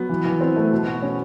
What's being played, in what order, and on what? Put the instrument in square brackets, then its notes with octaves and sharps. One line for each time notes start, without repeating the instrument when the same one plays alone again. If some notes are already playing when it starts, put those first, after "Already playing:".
Already playing: [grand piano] F#3 [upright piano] B3
[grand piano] E3
E3
C4
A3
B2
F#4
C#4